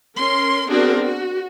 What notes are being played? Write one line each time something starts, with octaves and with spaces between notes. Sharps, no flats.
C#4 A#4 C6
B3 C4 D4 F#4 G#4 A#4
F#4